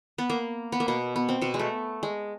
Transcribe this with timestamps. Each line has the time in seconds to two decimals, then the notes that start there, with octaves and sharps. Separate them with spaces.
0.18 B3
0.30 A#3
0.72 B3
0.80 A#3
0.88 B2 B3
1.16 B3
1.29 C4
1.42 B2 B3
1.54 G#3
1.59 A3
2.03 G#3